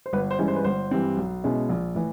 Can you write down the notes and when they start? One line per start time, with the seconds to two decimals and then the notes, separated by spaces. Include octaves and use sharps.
0.06 C5
0.13 G1 B4
0.31 C5
0.39 G2 E3 G#3 C#4
0.48 C5
0.56 B4
0.64 G1 C5
0.91 G2 E3 G3 C4
1.17 B1
1.44 B2 G#3 C#4 E4
1.69 A#1
1.95 A2 E3